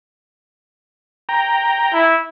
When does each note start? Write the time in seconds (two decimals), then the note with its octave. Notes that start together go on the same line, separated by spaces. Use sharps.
1.29 G5 A#5
1.93 E4